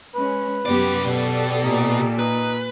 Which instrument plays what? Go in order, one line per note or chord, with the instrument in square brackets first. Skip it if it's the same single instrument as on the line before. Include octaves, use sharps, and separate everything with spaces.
[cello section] G#3 C#4 [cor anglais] B4
[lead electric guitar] C2 D5 [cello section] F#2 B3 G4
[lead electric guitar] B2 [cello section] G4 A4 D5
[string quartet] A#2 [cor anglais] D#4
[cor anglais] D#4 [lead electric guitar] B4